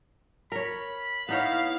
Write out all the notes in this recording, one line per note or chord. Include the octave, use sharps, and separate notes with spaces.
A#4 C#5 B5
B3 D#4 E4 C#5 F5